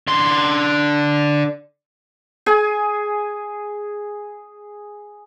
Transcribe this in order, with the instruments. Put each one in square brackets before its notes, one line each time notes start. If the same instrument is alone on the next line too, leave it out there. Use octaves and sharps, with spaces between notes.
[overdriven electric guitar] D3 C6
[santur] G#4 G#5